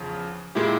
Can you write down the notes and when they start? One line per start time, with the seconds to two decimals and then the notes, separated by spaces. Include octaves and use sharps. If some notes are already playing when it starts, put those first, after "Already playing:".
Already playing: E2 C#3 F3
0.55 A#2 G#3 E4 G4